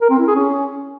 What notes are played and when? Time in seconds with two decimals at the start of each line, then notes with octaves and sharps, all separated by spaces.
0.02 A#4
0.10 C4
0.19 E4
0.27 G#4
0.36 C#4